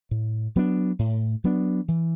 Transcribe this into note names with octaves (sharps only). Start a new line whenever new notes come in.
A2
F#3 B3 D4
A2
F#3 B3 D4
E3